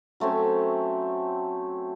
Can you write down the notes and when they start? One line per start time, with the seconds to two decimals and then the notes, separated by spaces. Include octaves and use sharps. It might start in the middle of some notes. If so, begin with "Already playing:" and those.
0.20 F#3 A3 C4 C#4